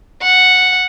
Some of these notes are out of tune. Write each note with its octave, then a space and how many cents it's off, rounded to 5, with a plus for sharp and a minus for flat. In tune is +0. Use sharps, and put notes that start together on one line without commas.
F#5 -5